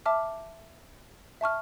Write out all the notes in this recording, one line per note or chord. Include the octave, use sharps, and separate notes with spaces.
E5 A5 D6 F6
E5 A5 C#6 F6